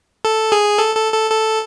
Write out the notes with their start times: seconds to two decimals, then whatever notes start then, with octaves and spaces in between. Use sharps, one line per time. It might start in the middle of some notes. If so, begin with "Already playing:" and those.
0.25 A4
0.52 G#4
0.78 A4
0.95 A4
1.13 A4
1.31 A4